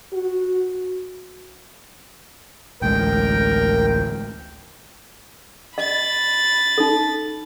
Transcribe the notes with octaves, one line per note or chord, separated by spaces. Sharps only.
F#4
A1 D2 G#3 A#4 G5
D#5 B5 A6
D#4 A4